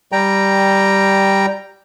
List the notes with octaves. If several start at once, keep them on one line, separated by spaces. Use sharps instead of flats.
G3 G5 A#5